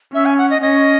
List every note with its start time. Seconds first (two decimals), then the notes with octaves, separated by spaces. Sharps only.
0.14 C#4 E5
0.26 G#5
0.38 F#5
0.50 D#5
0.61 C#4 D#5